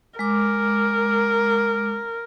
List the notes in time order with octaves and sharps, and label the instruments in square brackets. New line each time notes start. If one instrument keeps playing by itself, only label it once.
[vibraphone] G#3 D6 [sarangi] A#4